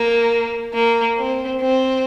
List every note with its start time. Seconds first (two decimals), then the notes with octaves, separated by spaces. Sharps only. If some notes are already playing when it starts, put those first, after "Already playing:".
Already playing: A#3
0.73 A#3
1.17 C4
1.60 C4